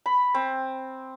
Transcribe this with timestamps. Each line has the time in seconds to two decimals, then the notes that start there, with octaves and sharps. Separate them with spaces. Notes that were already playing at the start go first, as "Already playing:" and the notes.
0.06 B5
0.35 C4